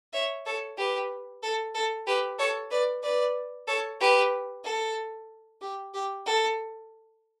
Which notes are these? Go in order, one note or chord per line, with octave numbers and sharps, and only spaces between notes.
C#5 E5
A4 C#5
G4 B4
A4
A4
G4 B4
A4 C#5
B4 D5
B4 D5
A4 C#5
G4 B4
A4
G4
G4
A4